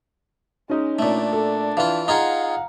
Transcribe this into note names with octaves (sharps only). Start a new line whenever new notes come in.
G#3 C#4 D#4
A#2 A3 D4
A4
E3 F4 F5
D#4 F4 G#4 F5 F#5 A#5